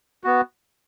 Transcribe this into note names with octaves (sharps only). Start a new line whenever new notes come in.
B3 F#4